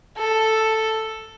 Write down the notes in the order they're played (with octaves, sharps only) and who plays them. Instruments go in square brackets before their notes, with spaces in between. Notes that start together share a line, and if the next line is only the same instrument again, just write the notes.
[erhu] A4